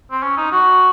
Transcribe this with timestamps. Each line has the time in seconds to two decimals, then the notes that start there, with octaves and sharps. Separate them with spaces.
0.11 C4
0.23 C#4
0.37 D#4
0.52 F#4